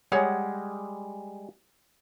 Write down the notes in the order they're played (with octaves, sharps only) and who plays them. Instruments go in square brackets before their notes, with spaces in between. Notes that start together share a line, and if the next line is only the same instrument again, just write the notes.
[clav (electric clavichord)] G3 G#3 [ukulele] G#4 C#5 F#5